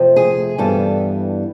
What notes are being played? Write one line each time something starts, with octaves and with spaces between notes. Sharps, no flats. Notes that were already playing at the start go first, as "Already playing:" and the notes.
Already playing: F2 C3 F3 A3
G#4
G2 E3 G3 B3 A4